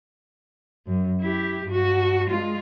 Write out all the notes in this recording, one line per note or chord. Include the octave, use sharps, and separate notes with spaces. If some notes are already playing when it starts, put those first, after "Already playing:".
F#2
E4 G4
G2 F#4
G#3 F4